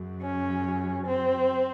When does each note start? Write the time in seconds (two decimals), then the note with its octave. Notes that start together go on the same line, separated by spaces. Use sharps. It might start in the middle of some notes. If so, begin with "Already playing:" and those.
Already playing: F#2 C#3 F#3
0.22 C#4
1.06 C4